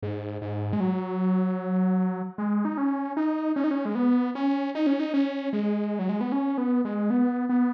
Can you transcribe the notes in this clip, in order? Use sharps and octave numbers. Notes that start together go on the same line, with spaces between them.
G#2
G#2
G#3
F#3
G#3
D#4
C#4
D#4
C#4
D#4
C#4
G#3
B3
C#4
D#4
C#4
D#4
C#4
G#3
F#3
G#3
B3
C#4
B3
G#3
B3
B3